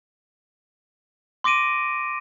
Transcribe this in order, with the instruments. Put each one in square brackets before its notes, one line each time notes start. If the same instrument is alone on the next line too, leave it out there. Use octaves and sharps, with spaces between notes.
[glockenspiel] C6 D6 A#6 D7 D#7